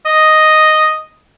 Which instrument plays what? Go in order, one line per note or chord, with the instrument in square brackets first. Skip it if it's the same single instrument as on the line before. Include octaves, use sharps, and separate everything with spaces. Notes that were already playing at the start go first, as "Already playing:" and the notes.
[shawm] D#5